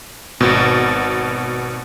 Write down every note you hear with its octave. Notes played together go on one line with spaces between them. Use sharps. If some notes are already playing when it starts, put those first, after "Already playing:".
G#1 B2